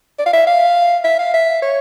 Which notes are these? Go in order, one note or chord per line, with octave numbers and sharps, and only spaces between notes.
D5
F5
E5
F5
E5
F5
E5
C#5